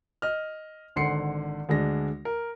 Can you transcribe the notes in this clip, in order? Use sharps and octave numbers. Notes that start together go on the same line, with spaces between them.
D#5 F6
G#1 D3 F#5 C6 C7 C#7
D2 G#3 D4 A#6
A#4